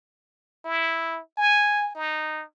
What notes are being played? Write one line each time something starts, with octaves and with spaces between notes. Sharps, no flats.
E4
G#5
D#4